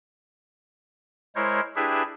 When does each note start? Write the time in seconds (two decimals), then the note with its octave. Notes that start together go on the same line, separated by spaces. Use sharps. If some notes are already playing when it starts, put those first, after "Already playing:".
1.35 G#3 E4 A#4 C5 C#5
1.76 D4 E4 G4 G#4 B4 E5